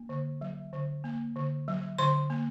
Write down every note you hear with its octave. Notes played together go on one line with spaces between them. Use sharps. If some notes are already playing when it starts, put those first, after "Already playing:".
Already playing: A#3
D3
F#3
D3
A#3
D3
F#3
D3 C6
A#3